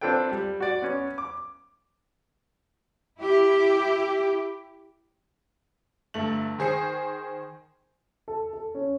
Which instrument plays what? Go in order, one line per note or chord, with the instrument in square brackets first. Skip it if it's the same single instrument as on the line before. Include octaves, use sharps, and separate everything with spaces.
[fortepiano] C4 D4 F4 A4 B4 G5
G3
F#4 D5
B3 C#4
D6
[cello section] E4 G4
[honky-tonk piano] G1 A3 F#7
D#3 G#4 C5 C7
[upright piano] A4
A4
C#4